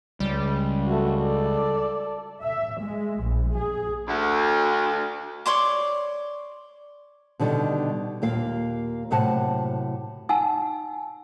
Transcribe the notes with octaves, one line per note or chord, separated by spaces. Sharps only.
C#2 G3
A3 F#4
A4 D5
E5
G#3
A#1
G#4
D2
C#5 D5 C6 D6
B2 D3 D#3 G3
D#2 A#2 A#3 F5
F#2 A2 C3 F#5 A5
D#4 F#5 G#5 E6